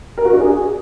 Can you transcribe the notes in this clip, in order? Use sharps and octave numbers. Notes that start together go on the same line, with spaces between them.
A#4
F#4
D4
G#4